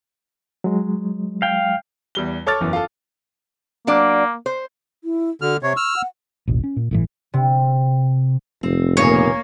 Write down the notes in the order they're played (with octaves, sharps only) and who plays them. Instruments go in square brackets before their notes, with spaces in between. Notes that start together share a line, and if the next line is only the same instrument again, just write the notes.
[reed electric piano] F#3 G#3
[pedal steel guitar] F5 G5
[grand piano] E2 G3 G7
A4 C#5 D6 F6 A6
F#1 E2 E3
F4 A4
[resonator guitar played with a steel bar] F#3 D4 D5 [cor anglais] A#3
[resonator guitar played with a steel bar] C5
[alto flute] E4
[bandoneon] D3 F6 [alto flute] F#4
[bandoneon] C3 C#5 [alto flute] C#6
[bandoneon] E6 F6
[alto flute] F#5
[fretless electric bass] A1 D#2 B2
C#4
A#2
G1 A2 E3
[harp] C3
[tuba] F1 [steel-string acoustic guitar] C4
[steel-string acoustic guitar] A#2 C#3 B3 [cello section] A#3 [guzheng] C#5